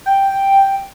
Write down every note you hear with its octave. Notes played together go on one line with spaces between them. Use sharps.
G5